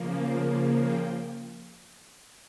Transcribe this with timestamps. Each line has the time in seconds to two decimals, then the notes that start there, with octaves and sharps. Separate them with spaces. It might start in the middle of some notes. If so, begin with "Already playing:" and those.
Already playing: C#3 F3 A#3
0.82 G5